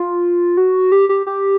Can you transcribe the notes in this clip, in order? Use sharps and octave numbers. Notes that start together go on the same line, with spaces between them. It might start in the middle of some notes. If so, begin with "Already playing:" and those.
Already playing: F4
F#4
G4
G4
G4